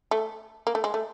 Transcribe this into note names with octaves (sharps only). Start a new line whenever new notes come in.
A3
A#3
A3
G#3
A3